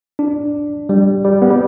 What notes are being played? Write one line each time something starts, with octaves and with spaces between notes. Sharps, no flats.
D4
G3
G3
B3
G3